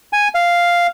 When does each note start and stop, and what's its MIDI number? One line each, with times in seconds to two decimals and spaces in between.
0.13 0.28 80
0.35 0.87 77